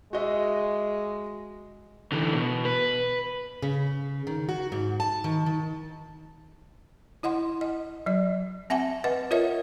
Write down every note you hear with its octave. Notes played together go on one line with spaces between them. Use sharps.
G#3 F#4 D#5 E5
D3 E3
B2
B4
C#3
D#3
F#4
G#2
A5
D#3
D#3
E4 D#5 F#5 C6
D#5
F#3 D5
C4 E5 F#5 G#5 A5
B4 D#5 F#5
F4 A#4 C#5 D#5 E5